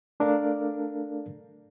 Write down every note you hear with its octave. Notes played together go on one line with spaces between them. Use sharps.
A3 D4 A4 A#4 D5 F5